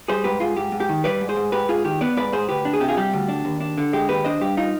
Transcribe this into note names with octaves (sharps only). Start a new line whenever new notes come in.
G3 G#4 C5
G#2 G4 B4
G#2 F4 G#4
G#2 G4
G#2
G4
D#3
G3 B4 D5
G#2
G#4 C5
G#2
G#2 G4 B4
G#2 F4 G#4
D#3 G4
B3 B4 D5
G#2 B4 D5
G#2 G#4 C5
D2 G4 B4
D4
G#4
C3 G4
F4 G#4
G3 G4
D2
D4
D#2
D4
D3
G#3 G4
D#2 G4 B4
D4 C5 D#5
G2 G4
D#4 F4